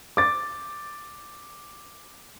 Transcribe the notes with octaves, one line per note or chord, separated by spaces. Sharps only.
D6 A6